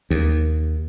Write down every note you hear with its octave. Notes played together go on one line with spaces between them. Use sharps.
D#2